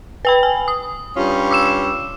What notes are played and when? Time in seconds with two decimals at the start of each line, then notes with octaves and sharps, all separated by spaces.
0.25 B4 G5 B5
0.43 G#5
0.68 D#6
1.16 G2 C#4 F4
1.51 D6 E6 E7